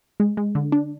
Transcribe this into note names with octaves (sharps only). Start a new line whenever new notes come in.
G#3
G#3
D3
D4